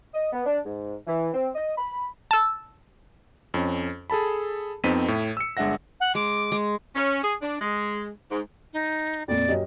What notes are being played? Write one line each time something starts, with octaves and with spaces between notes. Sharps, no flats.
D#5
B3
D4
G#2
E3
C4
D#5
B5
A5 E6
F2 C#4
G#4 A4 A5 B5
F2 B3 C4 D#4 B6 D#7
A2
E6 C#7
G1 G#3 D4 E5 F#5 A#6
F#5
G#3 D6
G#3
C#4
G#4
D4
G#3
G#2
D#4
F2 A#2 D5
F#2 G4 D#5